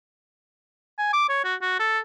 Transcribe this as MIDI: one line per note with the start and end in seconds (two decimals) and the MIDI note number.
0.98 1.09 80
1.13 1.29 86
1.29 1.41 73
1.44 1.55 66
1.61 1.75 66
1.79 1.99 69